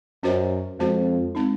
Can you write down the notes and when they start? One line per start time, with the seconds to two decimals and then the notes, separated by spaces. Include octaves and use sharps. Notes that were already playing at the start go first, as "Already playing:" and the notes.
0.23 F#2 C#4 F#4 C5 D#5
0.79 F2 G#3 C4 F#4 C5
1.35 G#3 C4 D#4